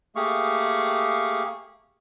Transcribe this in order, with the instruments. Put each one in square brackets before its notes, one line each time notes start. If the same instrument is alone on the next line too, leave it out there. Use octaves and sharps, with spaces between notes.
[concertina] A3 A#3 G4 G#4 F5 C#6